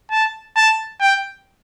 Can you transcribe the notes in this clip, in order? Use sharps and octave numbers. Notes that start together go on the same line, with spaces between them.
A5
A5
G5